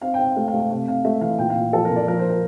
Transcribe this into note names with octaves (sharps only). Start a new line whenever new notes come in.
C4 F5
C4 G5
F5
A3 F5
F5
A3
F5
C3 F5
C3 F5
A3 E5
E3 F5
A#2 G5
F5
A#2
F3 A4
A#4
A#2
D5
F3 A#4
C5
A#4